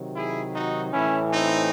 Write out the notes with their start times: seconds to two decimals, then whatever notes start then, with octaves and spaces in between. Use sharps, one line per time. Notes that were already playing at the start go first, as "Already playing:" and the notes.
Already playing: C3 D#3 F#3
0.15 E4 G#4
0.54 D#4 F#4
0.92 A2 E3 C#4 E4
1.31 C4 D#4